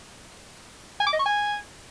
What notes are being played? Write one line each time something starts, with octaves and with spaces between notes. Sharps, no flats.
G#5
D6
D#5
C#6
G#5